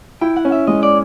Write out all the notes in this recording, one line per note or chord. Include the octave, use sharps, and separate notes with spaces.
E4 G5
F#5
C#4
E5
G#3 D#5
D5